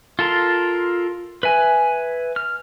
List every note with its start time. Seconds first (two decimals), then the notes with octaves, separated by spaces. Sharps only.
0.19 F4 A4 A#4 C6
1.43 B4 E5 G#5
2.36 F6